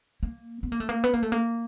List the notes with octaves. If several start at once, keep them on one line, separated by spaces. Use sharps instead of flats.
A#3
B3
A#3
A3
A#3
B3
A#3
A3
A#3